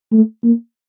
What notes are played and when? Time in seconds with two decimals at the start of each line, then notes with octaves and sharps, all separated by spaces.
0.12 A3
0.44 A#3